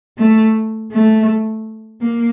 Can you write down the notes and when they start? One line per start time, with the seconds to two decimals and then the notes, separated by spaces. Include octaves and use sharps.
0.18 A3
0.91 A3
2.01 A#3